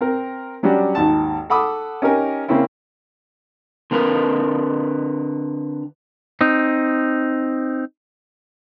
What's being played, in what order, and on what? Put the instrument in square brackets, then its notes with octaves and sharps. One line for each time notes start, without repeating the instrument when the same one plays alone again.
[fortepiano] C4 A#4
F#3 G3 C#4 D4 F#4 G4
G#1 D#2 A5
A4 F#5 B5 D6 D#6
C#4 D#4 G4 A#4 G#5
C#3 A#3 C4 C#4 E4
[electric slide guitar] D3 C4 A#4 B4
C4 D#4